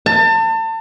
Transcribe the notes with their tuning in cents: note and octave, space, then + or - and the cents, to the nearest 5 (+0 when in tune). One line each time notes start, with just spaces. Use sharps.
A5 +35